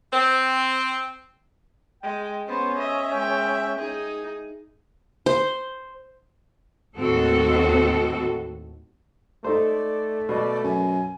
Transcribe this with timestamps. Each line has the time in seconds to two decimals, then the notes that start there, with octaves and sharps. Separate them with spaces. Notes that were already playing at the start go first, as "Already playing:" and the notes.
0.12 C4
2.03 G#3 G5
2.48 B3 C#4 C5
2.78 D#5 E5
3.13 G#3 G5
3.78 D#4 G#4
5.26 C5
6.98 D#2 A2 D#3 C4 F#4 A4
9.44 A3 D#4 A4 C5 D5
10.29 B2 D5
10.64 F#2 G#5